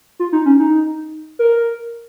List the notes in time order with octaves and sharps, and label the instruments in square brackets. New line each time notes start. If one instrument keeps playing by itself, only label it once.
[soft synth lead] F4
D#4
C#4
D#4
A#4